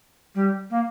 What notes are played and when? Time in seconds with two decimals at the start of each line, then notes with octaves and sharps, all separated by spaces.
0.34 G3
0.70 A#3